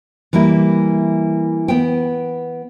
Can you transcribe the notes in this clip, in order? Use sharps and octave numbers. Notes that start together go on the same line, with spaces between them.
E3 G3 A#3 E4
B3 G5